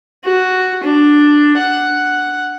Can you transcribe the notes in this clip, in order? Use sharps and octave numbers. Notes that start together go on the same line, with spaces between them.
F#4
D4
F#5